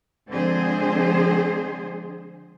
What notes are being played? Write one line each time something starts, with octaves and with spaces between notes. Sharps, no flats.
D3 F3 G#3 C4 G#4 C5